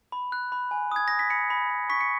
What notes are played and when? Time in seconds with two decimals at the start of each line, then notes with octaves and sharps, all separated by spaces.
0.12 B5
0.32 F#6
0.52 B5
0.71 G#5
0.92 D#6 G#6
1.08 D#6 A#6
1.19 B6
1.30 B5 C#7
1.50 B5
1.70 B5
1.89 C#6 B6
2.00 C#7